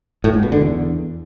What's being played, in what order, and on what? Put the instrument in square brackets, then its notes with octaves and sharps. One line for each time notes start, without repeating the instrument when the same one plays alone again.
[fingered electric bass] A2
G#2
B2
D3
E2